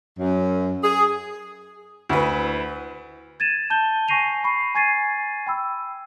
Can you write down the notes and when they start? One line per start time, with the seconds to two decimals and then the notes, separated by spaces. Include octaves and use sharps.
0.19 F#2
0.84 G#4
2.09 D2 E4 B4
3.40 G#6 A6 D#7 E7
3.70 A5 G6 G7
4.08 G#5 C#6 A#6 C7 D#7 F7
4.44 B5 C#6 C7
4.75 G#5 C#6 G#6 A6 C7 D#7
5.47 G5 B5 E6